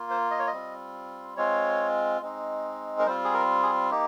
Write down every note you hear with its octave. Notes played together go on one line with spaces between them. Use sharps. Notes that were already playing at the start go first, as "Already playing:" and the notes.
Already playing: A#3 F4
C5
D#5
C#5
D#5
G3 C4 F4
G#3 C4 F4 C#5
G#3 C4 D#4
A#4
G3 C4 F4 C5
G#4
A#4
G#4
A#3 D#4 G4